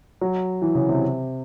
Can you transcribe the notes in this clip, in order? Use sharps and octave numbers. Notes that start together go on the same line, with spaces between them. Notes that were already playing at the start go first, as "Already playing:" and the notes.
F#3
E3
C#3
C3